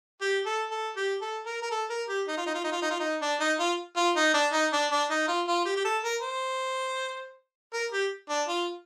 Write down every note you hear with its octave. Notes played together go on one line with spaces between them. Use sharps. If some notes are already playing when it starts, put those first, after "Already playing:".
G4
A4
A4
G4
A4
A#4
A#4
A4
A#4
G4
D#4
F4
D#4
F4
D#4
F4
D#4
F4
D#4
D4
D#4
F4
F4
D#4
D4
D#4
D4
D4
D#4
F4
F4
G4
G4
A4
A#4
C5
A#4
G4
D4
F4